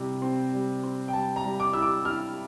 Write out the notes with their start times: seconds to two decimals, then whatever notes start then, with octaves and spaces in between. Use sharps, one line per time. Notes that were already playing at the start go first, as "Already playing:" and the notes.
Already playing: C3 G3 E4
0.22 C4
0.53 G3
0.83 C4
1.08 G5
1.13 G3 A5
1.36 A#5
1.44 G3
1.60 D6
1.73 E4 E6
1.82 D6
2.05 E4 F6